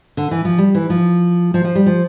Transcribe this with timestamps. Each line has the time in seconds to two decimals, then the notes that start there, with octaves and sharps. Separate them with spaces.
0.17 D3
0.31 E3
0.45 F3
0.58 G3
0.75 E3
0.90 F3
1.54 F3
1.65 F3
1.75 G3
1.86 F3